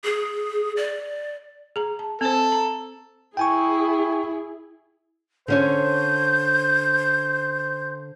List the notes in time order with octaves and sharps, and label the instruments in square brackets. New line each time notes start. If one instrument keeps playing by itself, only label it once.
[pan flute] G#4
D5
[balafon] G#4 A#5
A5
[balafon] C4 C5 [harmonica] A4
[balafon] A#5
[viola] E4 G#4 [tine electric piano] G5 G#5 C#6
[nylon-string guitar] D3 C#4 C#5 [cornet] C5 [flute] G6